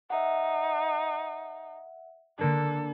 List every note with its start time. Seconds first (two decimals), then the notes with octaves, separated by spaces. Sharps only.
0.10 D#4 E5 F#5
2.39 D3 A#3 D4 A4